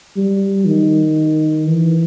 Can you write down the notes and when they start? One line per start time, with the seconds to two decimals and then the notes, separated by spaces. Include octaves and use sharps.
0.16 G3
0.66 D#3
1.67 E3